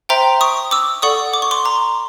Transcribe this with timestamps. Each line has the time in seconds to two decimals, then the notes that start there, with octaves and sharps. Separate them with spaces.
0.09 C5 E5 G5 A#5 C6
0.41 C#6 D#6
0.71 D6 E6
1.02 A4 D5 F#5 C#6 D#6
1.33 D6
1.42 C#6
1.51 C6 D6
1.65 A#5 C6